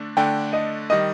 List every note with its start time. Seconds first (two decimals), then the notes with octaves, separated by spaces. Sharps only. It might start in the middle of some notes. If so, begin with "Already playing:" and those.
Already playing: D3 A3 D4
0.17 D3 A3 D4 G5
0.53 D#5
0.90 D#3 G3 D#5